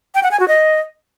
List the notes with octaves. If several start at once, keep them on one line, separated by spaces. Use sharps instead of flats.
G5
F#5
G#5
F#4
D#5